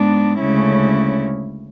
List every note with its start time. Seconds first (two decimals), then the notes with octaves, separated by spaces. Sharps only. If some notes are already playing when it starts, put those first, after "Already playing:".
Already playing: G#2 G#3 B3 D4
0.41 D2 C#3 G#3 C#4 E4